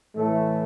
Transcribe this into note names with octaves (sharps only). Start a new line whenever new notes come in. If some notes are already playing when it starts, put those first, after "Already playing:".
A2 E3 A3